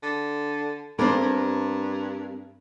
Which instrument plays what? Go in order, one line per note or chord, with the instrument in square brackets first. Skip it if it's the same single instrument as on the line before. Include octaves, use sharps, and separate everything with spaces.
[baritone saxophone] D3
[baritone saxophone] G2 [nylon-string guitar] C4 A#4
[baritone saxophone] G2